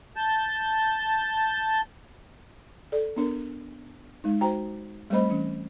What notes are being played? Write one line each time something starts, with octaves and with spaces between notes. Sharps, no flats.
A5 G6
A4 D5
B3 D4 A#4
G#3 D#4
F#4 C5 G5 A#5
G3 A3 C4 C5 D#5 B5
E3 C#4